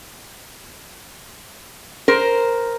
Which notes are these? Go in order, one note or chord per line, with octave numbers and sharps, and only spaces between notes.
A#4 C5